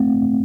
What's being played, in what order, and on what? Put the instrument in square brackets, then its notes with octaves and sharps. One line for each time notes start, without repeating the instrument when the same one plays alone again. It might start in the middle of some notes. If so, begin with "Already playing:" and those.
Already playing: [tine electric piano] A3 C4